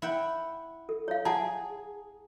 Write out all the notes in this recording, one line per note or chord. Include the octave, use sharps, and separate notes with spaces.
E4 F#5 G5
A4
C#5 F5
G#4 F#5 A5 A#5